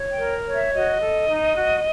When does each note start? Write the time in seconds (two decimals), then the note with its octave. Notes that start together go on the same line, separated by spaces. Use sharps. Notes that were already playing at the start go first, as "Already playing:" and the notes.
Already playing: C#5
0.12 G5
0.18 A#4
0.46 C#5
0.53 E5
0.74 F#4 D#5
1.01 A4
1.28 D#4
1.55 F#4